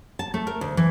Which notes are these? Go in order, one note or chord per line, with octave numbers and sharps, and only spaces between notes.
A5
A3
A#4
D2
E3